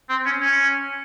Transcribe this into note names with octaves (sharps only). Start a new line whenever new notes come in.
C4
C#4
C#4